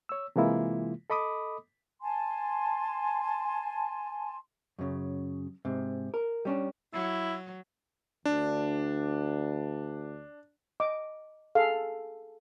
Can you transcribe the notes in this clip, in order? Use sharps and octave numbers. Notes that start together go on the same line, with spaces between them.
C#5 E6
C3 E3 G#3 A#3 E4 F4
A4 D#5 B5 D6 D#6
G#5 A5 C6
F#2 C#3
G#2 C3
A#4
G3 C#4 D4
F#3 E4
D2 D4
D#5 D6
G#4 A4 F5